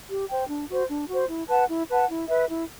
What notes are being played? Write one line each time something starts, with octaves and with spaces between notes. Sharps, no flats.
G4
C5 G5
D4
F#4 C5
D4
F#4 C5
E4
B4 F#5 A5
E4
B4 F#5 A5
E4
B4 E5
E4